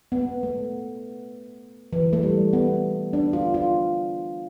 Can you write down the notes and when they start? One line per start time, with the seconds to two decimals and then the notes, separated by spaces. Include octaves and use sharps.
0.12 B3
0.43 A3
1.93 E3
2.13 A3
2.23 G3
2.53 B3
3.13 D4
3.33 F4
3.54 F4